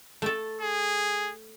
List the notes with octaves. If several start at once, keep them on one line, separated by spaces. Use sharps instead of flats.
A3 A4
G#4